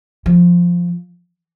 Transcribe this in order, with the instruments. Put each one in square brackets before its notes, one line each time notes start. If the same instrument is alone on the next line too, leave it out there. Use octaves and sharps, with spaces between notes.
[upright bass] F3